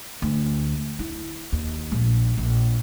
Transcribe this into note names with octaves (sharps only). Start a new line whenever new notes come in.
D2
E4
D#2
A#1
A#1